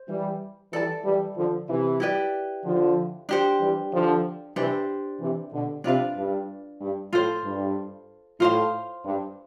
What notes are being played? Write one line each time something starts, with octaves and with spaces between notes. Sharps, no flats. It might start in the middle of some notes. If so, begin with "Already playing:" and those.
Already playing: C5
E3 G3
E3 G3 A4 D5 A5
E3 G3
D3 F3
C3 E3
E4 G4 B4 D5
D3 F3
D4 G4 C5
E3 G3
D3 F3
C3 E3 D4 G4 C5
C3 E3
B2 D3
C3 D4 F4 B4 F5
G2
G2
A2 F4 A4 C5
G2
A2 F4 C5 F5
G2